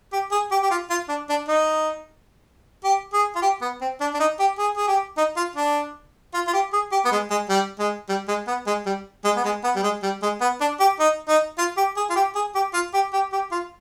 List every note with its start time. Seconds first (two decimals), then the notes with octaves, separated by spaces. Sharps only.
0.12 G4
0.32 G#4
0.51 G4
0.62 G4
0.71 F4
0.90 F4
1.09 D4
1.29 D4
1.48 D#4
2.84 G4
3.13 G#4
3.35 F4
3.42 G4
3.61 B3
3.81 C4
4.00 D4
4.14 D4
4.20 D#4
4.39 G4
4.58 G#4
4.77 G#4
4.88 G4
5.17 D#4
5.36 F4
5.56 D4
6.34 F4
6.47 F4
6.53 G4
6.73 G#4
6.92 G4
7.05 B3
7.11 G#3
7.30 G#3
7.49 G3
7.79 G#3
8.09 G3
8.28 G#3
8.47 B3
8.67 G#3
8.86 G3
9.24 G#3
9.36 B3
9.44 G#3
9.64 B3
9.75 G3
9.83 G#3
10.03 G3
10.22 G#3
10.41 B3
10.61 D4
10.80 G4
10.99 D#4
11.28 D#4
11.58 F4
11.77 G4
11.97 G#4
12.10 F4
12.16 G4
12.35 G#4
12.55 G4
12.74 F4
12.94 G4
13.13 G4
13.32 G4
13.51 F4